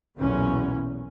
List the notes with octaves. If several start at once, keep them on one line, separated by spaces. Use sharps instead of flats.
B1 E2 A#2 C#4